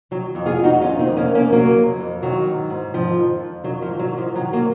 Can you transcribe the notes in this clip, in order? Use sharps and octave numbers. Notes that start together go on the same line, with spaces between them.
D#3 F#3
F2
F4 G#4
F2
D#4 F#4
D#3 C#4 F4
C4 D#4
F2
A#3 C#4
F2
A#3 C#4
C#3 F#3 A#3
F2
F2
D#3 F#3
G#2
G#2
D#3 F3
F2
F2
D#3 F#3
F3
G#2
F#3
G#2
F3
D#3 F#3
F#3 A#3